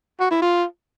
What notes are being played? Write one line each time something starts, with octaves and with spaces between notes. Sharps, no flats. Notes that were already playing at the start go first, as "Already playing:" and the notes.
F#4
E4
F4